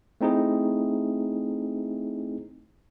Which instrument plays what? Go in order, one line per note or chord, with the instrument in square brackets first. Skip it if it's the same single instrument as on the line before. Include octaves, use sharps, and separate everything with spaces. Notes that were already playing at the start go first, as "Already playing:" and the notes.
[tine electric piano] A3 C4 D#4 E4 G#4